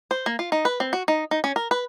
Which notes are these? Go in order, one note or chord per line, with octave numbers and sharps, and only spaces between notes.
C5
A#3
F4
D#4
B4
C4
F#4
D#4
D#4
C#4
A#4
B4